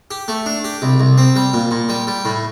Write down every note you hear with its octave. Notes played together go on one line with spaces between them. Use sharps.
G4
A3
D4
G4
C2
C2
C4
G3
A#2
A#2
G3
G3
A2